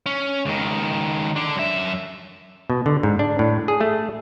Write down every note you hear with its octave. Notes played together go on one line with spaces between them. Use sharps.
C#4
C#2 D#3
D3 D4
F#2 E5
B2
D3
G#2
D4
A2
G#4
A3